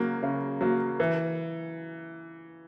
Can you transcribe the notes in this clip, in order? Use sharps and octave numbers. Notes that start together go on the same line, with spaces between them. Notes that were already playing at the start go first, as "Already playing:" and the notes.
Already playing: C#3 F#3 A#3
C#3
F#3 A#3
E3